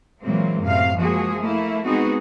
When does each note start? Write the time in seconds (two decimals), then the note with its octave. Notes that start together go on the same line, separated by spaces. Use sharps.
0.22 A#2 E3 F#3 G#3 A#3 C4
0.62 F#2 A2 C3 F5
0.97 F3 G#3 A#3 F#4 G#4
1.39 A3 A#3 E4
1.85 G#3 B3 C4 D#4 F#4 G#4